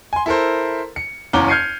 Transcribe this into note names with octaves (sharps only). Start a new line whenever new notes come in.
G#5 C6
E4 A4 A#4 C5
C#7
F#1 E2 C#4 A#5 D6 G7
F6 G6 G#6 C7 C#7 D#7